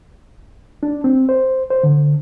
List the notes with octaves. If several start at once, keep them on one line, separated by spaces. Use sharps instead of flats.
D4
C4
C5
C5
D3